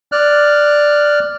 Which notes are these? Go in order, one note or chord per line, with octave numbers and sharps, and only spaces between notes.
D5 F6 F#6